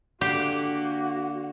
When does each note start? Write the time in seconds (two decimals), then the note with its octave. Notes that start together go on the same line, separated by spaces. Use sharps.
0.21 D3 A#3 D4 F#4 G4